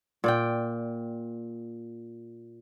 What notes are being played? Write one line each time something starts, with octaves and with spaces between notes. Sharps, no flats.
A#2 D5 G5